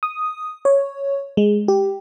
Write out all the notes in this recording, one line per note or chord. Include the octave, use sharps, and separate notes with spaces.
D#6
C#5
G#3
G4